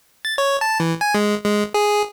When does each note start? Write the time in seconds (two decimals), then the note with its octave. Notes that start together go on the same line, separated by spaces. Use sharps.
0.25 A6
0.38 C#5
0.61 A5
0.80 E3
1.01 G#5
1.14 G#3
1.45 G#3
1.74 G#4